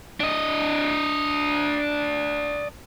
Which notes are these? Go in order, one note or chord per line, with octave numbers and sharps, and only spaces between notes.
D4 D#5